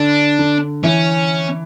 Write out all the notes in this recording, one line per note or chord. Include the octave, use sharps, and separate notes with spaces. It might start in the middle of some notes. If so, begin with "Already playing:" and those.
Already playing: D3 D4
D3
E3 C#4